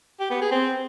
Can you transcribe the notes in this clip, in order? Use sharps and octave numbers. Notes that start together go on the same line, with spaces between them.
G4
B3
G#4
C4